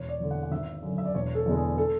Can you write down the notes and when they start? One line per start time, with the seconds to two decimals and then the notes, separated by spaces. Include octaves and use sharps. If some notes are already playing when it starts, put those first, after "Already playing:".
Already playing: E1 C#5
0.09 D5
0.20 E2 D3
0.31 F#5
0.43 F#5
0.51 G#1 E5
0.83 F#2 D3
0.98 E5
1.05 D5
1.15 E1 C#5
1.35 A4
1.46 E2 D3 G#3 B3
1.56 G#4
1.78 A4